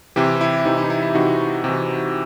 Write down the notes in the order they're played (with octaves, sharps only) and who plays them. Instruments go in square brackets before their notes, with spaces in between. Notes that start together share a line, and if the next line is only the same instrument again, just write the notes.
[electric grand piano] C3 E3 E4 G4
E4
C3 E3 D#4
E4
D#4
E4
E4
C3 E3 D#4 F#4
C3 E3